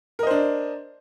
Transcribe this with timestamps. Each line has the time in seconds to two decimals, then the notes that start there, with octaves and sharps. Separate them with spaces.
0.19 A#4
0.23 D#5
0.27 C5
0.31 D4